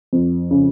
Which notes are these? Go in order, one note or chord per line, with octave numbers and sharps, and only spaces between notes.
F2
C#3